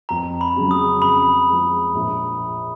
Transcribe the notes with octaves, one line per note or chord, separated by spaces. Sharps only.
F2 A#5
B5
C#3 F#3
D#6
F2 B5
F3 G#3
A#1